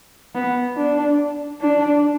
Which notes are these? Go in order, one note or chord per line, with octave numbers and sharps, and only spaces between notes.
B3
D4
D4